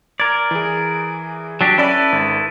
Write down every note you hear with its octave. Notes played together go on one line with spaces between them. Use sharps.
A#4 D5 G#6
E3 G#4
F#3 D4 G4
C#4 E4 A4 B4 D5
G#1